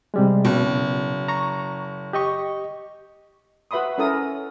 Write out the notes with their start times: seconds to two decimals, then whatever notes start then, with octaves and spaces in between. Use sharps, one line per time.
0.14 C3 G3 G#3
0.45 F#1 B2
1.28 A#5 C#6
2.13 G4 D#5 C#6
3.71 F#4 B4 E5 B5 C6 D#6
3.98 C#4 E4 A4 A#4 D#6